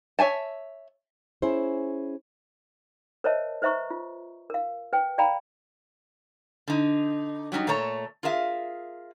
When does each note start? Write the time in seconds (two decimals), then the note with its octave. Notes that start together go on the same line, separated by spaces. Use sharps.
0.19 C#5 E5 G#5 A5
1.42 C#4 E4 G#4 C5
3.24 A#4 C5 C#5 D#5 E5 A5
3.62 B4 C5 E5 A#5 C#6
3.90 F4
4.50 A#4 F5
4.93 B4 G5
5.18 D5 F5 G5 A#5 B5
6.68 D3 D#4
7.52 F#3 G3 C#4 D#4
7.67 A#2 A3 A4 C#5 A#5
8.23 F4 G#4 A#4 E5 F5